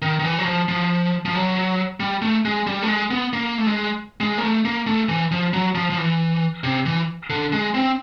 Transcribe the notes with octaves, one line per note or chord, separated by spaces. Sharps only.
D#3
D#3
E3
F#3
F3
F3
F3
F#3
G3
A3
G#3
G3
A3
G#3
B3
A#3
A3
G#3
G#3
A#3
A3
A#3
A3
E3
F3
F#3
F3
F3
E3
C3
E3
D3
G#3
C4